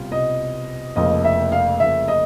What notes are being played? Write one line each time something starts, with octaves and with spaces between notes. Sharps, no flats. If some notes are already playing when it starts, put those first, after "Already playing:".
Already playing: C2 B2 G3 C4 F4
C2 B2 G3 C4 F4 D#5
F1 F2 C#3 F3 A#3 D#5
E5
F5
F1 F2 C#3 F3 A#3 E5
D#5